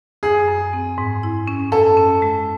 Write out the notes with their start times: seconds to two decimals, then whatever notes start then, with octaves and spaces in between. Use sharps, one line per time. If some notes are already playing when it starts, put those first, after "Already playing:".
0.23 F#2 G#4
0.48 F#2
0.73 C4
0.98 G#2
1.23 E4
1.48 C#4
1.72 F#2 A4
1.97 C#4
2.22 G#3